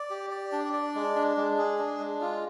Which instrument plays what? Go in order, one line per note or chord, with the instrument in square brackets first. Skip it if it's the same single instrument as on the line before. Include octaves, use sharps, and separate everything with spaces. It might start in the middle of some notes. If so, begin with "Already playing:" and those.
Already playing: [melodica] D5
G4
D5
D4
D5
G#3
D4
G#3
G#4
D4
G#3
F4